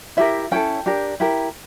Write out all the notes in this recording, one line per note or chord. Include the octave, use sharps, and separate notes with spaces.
E4 G4 A#4 E5
C#4 E4 A4 G5
D4 G4 A#4
E4 G4 A#4